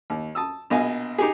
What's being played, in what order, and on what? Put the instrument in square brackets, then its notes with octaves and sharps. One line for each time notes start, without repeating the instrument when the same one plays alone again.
[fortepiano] D#2
A5 D#6 E6
A#1 B2 D#5 F5 G#5
D#4 G4 G#4